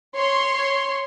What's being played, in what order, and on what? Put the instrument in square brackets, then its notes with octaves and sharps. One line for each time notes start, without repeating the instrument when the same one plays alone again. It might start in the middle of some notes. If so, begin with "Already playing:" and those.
[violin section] C#5 C6